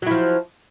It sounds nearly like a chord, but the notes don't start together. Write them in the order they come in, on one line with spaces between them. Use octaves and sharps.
F#3 E4 F3